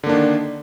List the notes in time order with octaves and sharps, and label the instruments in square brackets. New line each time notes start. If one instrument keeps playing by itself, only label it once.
[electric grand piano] D3
A#3
D4
D#3